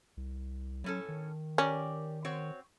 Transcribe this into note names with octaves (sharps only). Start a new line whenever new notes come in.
C2
A2 F#3 C#4 A4
D#3
C#4 G4 A#4 D5
C4 F#4 C#5